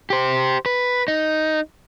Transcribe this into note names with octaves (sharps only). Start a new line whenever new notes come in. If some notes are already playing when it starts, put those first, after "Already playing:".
G4 C5
B4
D#4